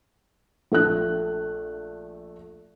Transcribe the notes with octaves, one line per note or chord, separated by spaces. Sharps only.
A#1 A3 D4 F#6